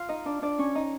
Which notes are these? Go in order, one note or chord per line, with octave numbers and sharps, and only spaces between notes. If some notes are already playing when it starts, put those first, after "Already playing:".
Already playing: F4 F5
D#4 D#5
D4 D5
D4 D5
C#4 C#5
D#4 D#5